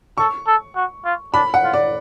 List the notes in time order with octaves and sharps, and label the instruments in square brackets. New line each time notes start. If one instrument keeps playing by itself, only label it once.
[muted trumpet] A4 [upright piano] C#6
[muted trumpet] A4
F#4
F4
[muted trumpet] D4 [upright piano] B5
[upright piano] F#5
[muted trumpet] F4
[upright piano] D5